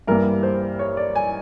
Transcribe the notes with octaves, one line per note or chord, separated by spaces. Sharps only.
G2 E3 G3 A#3 A#4
C5
C#5
D5
G#5